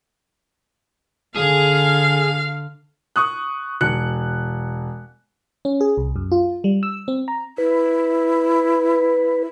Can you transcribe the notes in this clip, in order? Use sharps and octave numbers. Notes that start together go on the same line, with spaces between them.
D3 G#4 F5
C#6 D#6 F#6
E1 F#6 C#7
C#4
G#4
C2
F#2
F4
G3
E6
C4
A#5
E4 B4